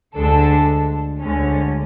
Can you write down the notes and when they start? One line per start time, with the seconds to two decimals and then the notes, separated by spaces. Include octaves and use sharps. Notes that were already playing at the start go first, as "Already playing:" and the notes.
0.16 D2 D3 G#3 D4 A4
1.20 D2 D3 G#3 C#4